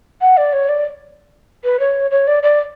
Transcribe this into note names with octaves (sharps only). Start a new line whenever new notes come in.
F#5
D5
C#5
D5
B4
C#5
C#5
D5
D5